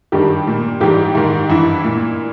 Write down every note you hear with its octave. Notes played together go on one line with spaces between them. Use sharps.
G2 D#3 G3 G4
A#2
G#2 E3 G3 G4
G#2 D#3
G2 E3 E4
A#2